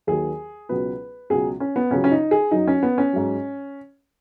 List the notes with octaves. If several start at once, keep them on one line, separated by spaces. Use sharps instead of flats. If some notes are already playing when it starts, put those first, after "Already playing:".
D#2 D#3 F#3 G#4
C#2 B2 F#3 B4
C#2 B2 F#3 G#4
C#4
B3
C#2 C#3 F#3 C#4
C#4
D#4
G#4
F#2 F#3 D#4
C#4
B3
C#4
G#2 F#3